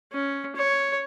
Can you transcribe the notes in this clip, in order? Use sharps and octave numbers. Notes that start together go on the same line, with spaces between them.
C#4
C#5